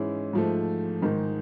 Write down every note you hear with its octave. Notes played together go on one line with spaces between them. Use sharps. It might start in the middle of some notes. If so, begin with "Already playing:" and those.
Already playing: G#2 E3 G#3 C#4 E4
G#2 F3 A3
G#2 D#3 G#3